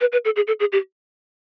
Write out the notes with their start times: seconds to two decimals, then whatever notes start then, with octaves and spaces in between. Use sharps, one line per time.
0.01 B4
0.12 B4
0.25 A4
0.36 G#4
0.47 A4
0.60 G#4
0.72 G4